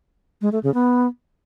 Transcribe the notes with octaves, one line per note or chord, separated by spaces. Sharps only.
G#3
A3
C#3
B3